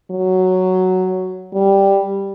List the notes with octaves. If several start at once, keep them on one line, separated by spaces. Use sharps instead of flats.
F#3
G3